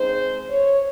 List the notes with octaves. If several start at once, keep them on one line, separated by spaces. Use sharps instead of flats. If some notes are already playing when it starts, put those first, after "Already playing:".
Already playing: C#3 G#3 C4 D#4 C5
C#5